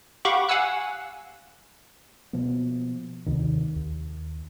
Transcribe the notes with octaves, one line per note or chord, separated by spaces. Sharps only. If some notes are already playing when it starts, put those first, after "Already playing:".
G4 F5 F#5 B5 C#6 D6
F5 F#5 G#5 E6 F#6
B2 F3 A#3 B3
D#2 C3 D#3
D#2